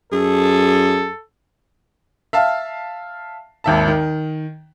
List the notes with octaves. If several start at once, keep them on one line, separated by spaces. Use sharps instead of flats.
F#2 G#4 A4
E5 F5 A5
G#1 D#2 E5 A5
D#3